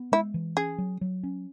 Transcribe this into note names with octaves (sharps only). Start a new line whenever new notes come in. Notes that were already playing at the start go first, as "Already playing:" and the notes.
Already playing: B3
G#3 E4
E3
C#4 G#4
F#3
F#3
C#4